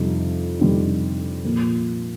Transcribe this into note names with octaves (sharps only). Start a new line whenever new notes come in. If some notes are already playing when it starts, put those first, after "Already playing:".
Already playing: F2 C3 G3 C4 D#4
F2 C3 G3 C4 D#4
A#2 F3 A#3